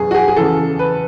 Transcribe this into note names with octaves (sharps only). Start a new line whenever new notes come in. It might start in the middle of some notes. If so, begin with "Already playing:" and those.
Already playing: F#1 E2 B2 F#3 G#4
F#4
G#4
G#4
E2 C#3 E3 A4
B4